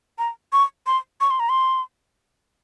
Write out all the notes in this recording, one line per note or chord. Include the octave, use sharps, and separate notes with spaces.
A#5
C#6
C6
C#6
C6
A#5
C6